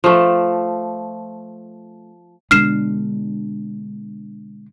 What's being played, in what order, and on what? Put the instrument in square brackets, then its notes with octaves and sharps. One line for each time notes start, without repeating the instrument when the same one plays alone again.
[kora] F3 A3
[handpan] B2 D3 D4 [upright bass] G#3 [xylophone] F6 C7 E7